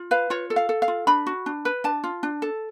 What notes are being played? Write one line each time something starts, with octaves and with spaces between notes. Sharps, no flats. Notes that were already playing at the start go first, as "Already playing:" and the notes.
Already playing: F4
B4 F5
F4 C#5
A4
F5
A4
F5
F4
D4 B5
F#4
D4
B4
D4 A5
F4
D4
A4